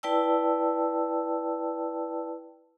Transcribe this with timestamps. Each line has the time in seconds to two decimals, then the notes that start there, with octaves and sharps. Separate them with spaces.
0.03 E4 B4 D5 G5 A5 E6